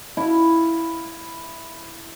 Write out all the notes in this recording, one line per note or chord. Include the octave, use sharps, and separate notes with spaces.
E4 F5